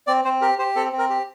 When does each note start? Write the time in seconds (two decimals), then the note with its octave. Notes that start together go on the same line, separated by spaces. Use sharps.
0.07 C4 D5
0.24 C4 C5
0.41 G4 A#4
0.59 G4 C5
0.76 C4 A4
0.93 C4
0.99 A#4
1.10 G4